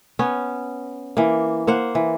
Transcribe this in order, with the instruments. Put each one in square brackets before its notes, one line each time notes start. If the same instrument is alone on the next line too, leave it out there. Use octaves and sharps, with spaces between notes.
[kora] B3 C#4
E3 A#3
A#3 C5 F#5
E3